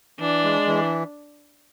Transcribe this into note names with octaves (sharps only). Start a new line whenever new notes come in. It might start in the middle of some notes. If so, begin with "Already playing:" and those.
E3 D4
G#3
E3